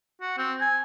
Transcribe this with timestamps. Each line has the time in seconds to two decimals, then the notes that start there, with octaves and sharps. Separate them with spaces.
0.21 F#4
0.38 C4
0.60 G#5